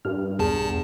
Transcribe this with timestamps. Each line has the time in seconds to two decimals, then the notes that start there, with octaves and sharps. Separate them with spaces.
0.05 G2 F6
0.39 B1 E2 G#4 A5